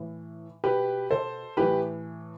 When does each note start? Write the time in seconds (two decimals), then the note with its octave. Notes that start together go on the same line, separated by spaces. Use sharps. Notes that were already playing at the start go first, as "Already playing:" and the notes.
Already playing: A2 E3
0.64 B2 G4 B4
1.10 A4 C5
1.57 A2 E3 G4 B4